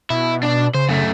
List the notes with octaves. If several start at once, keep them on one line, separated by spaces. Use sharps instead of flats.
B2 E4
D4 D5
C#3 C5
F#2 A3